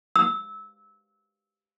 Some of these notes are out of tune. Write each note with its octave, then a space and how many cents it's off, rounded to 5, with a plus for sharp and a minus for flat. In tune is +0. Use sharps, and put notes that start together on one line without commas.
E6 -25